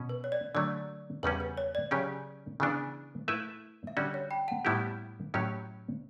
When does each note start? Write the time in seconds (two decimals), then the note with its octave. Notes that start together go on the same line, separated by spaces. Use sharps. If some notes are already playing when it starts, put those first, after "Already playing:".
Already playing: B2 C#4
0.09 B4
0.24 C#5
0.32 D5
0.55 D3 F#3 A3 D5
1.23 E2 C#3 G3 C#4 B4
1.40 B4
1.57 C#5
1.75 D5
1.91 C#3 F#3 C#4 G4 C#5
2.60 C#3 E3 B3 D4
3.28 A3 E4 B4 E5
3.87 E5
3.97 D3 G3 C#4 F#4 D5
4.14 C#5
4.31 G5 B5
4.48 F#5 A5
4.65 A2 G3 B3 E4 G4
5.34 A2 F#3 C#4 G4 C#5